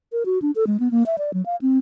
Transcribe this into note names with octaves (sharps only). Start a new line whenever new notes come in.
A#4
F#4
D4
A4
G#3
B3
A#3
E5
D5
F#3
F5
C4